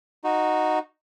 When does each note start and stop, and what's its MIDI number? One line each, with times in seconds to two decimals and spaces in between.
0.24 0.79 63
0.24 0.79 66